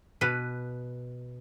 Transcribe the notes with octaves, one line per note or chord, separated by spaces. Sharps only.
B2 B4